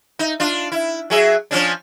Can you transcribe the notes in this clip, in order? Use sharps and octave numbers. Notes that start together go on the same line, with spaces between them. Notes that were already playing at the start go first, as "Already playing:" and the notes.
D#4
D4 F4
E4
F#3 G#4 E5
F3 C#4 D4